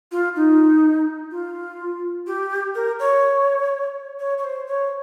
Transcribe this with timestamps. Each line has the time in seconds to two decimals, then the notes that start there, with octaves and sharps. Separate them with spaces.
0.12 F4
0.36 D#4
1.31 F4
2.27 G4
2.75 A#4
2.99 C#5
4.20 C#5
4.38 C#5
4.44 C5
4.67 C#5